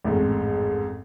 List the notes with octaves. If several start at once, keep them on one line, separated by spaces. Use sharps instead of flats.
A1 F2 G#2